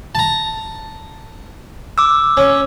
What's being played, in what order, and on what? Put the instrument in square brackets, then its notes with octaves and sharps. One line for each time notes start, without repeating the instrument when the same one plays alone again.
[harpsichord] A5 A#5
[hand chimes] D6 E6
[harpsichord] C#4